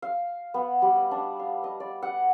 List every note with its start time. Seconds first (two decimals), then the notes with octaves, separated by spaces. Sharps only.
0.02 F5
0.54 B3
0.82 G3
0.96 D#5
1.11 D4
1.39 F5
1.64 D#5
1.80 D5
2.02 F#5